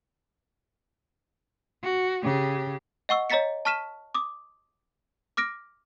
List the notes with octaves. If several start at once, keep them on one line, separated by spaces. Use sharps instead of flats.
F#4
C#3 G4
D#5 F#5 C#6 E6
C#5 D#5 A#5 A6 B6 C#7
A5 C#6 F6 B6 D#7 E7
D6 D#6
D6 F6 A#6 D7